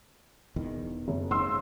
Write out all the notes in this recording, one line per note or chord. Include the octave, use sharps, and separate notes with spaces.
E1 E2 D#3
F#1
G#2 C#3 C6 E6